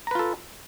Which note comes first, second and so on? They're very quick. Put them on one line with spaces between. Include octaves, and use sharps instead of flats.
A#5 B4 F4 A4